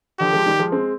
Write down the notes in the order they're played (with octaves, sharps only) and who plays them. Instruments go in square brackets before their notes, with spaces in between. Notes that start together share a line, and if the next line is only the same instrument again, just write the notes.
[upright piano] D3 F3 [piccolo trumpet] G4
[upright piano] F3 G#3
D#3 G3
F3 G#3
G#3 C4